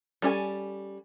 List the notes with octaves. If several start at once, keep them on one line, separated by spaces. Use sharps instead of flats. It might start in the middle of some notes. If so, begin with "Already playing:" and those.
G3 C#4 A4 C#5 G#5